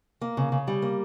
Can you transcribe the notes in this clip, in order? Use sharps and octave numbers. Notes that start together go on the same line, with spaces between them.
A#3
C#3
C#3
G3
A#3